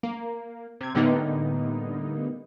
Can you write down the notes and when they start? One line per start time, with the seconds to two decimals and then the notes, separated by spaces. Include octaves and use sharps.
0.03 A#3
0.81 C3 G#6
0.94 A2 D3 G3 A#3 B3 D#4